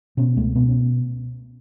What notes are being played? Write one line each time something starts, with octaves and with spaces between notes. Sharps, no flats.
B2 C#4
C#2 A3
B2 B3
C#4